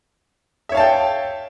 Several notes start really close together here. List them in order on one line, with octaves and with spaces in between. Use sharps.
E5 C#5 F5 A5 G5